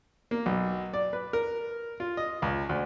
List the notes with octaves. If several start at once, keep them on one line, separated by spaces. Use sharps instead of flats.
A#3
B1
D5
B4
A#4
F4
D#5
C#2
D2